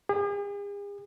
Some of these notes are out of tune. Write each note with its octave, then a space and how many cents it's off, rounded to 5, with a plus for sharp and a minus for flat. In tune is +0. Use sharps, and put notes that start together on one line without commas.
G#4 -45